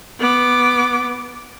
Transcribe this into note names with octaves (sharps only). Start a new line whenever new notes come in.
B3 D6